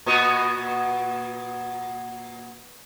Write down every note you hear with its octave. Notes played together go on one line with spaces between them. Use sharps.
A#2 B3 F#4